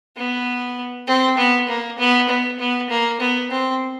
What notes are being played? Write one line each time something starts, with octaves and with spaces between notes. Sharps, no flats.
B3
C4
B3
A#3
B3
B3
B3
A#3
B3
C4